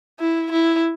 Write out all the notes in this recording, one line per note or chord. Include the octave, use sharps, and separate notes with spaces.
E4
E4